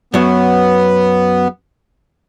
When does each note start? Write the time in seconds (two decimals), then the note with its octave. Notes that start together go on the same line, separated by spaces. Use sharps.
0.14 F#2 F#3 B3